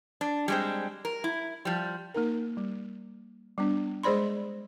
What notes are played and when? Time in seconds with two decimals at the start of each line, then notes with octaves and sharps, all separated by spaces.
0.21 D4
0.48 G3 G#3 C4
1.05 A#4
1.24 E4
1.65 F3 G3
2.15 A#3 D#4 A#4
2.57 G3
3.58 G3 B3 D4
4.03 G#3 G#4 C5 D5 B5 C6